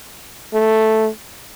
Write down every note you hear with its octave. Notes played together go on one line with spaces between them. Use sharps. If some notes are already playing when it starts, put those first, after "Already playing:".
A3